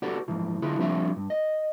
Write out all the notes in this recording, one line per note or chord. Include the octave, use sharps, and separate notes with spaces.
F#4 G4 A4 B4 D5 F#5
G#2 E3 F3
D3 E4 F4 G#4 B4
F3 G3 C4 D4 F4 E5
G2
D#5